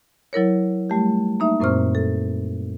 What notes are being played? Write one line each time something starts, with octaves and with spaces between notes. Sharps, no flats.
F#3 E4 A#4 C#5
G3 A3 G4
A#3 D#4 E5
F#2 A#2 C4 C5 C#6 F6
A4